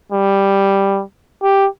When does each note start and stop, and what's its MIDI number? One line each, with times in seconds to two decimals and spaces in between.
0.12 1.03 55
1.43 1.68 67